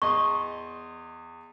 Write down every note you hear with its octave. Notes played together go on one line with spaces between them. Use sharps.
E2 D#5 C6 C#6